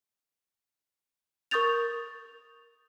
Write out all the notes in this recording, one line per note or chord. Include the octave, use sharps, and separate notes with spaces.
A#4 C#6 D#6 G6 A6 F7